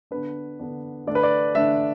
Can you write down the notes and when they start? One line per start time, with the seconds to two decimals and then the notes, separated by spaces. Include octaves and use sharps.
0.11 D3 B3 D4 B4
0.59 D3 B3 D4
1.07 D3 A3 D4 D5
1.15 B4
1.23 D5
1.55 D3 A3 D4 E5